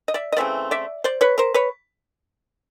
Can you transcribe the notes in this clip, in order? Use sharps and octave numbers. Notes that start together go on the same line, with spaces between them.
D#5
D5 E5
D#5
C#3 E3 A3 C4 D5 E5
D5 E5
C5 D5
B4 C#5
A#4 C5
B4 C#5